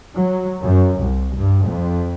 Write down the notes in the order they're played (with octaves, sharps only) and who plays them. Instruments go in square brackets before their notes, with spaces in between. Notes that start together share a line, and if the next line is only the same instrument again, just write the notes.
[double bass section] F#3
F#2
C2
G2
F2